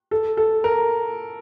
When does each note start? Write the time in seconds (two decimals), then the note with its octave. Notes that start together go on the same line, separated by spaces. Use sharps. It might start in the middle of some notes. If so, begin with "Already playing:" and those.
0.11 A4
0.37 A4
0.64 A#4